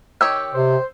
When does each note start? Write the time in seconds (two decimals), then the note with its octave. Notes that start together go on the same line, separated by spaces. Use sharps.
0.21 D#3 G4 C#5 E6
0.54 C3 C5